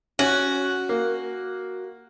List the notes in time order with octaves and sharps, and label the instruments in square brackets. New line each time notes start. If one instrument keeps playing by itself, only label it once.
[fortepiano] C#4 [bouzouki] F#4
[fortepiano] A#3